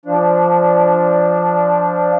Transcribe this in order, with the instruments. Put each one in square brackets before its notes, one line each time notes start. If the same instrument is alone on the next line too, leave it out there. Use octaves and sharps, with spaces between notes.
[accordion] F3 D4